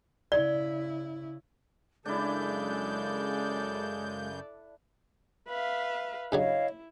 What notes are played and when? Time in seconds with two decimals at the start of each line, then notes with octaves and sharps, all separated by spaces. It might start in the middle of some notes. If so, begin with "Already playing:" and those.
0.32 C#3 E4 D5
2.06 F#2 C#3 G#3 D4 E4 A4 D5 G6
5.48 B4 E5 F5
6.32 G2 C#3 F#3 E4 C#5 D#5 F5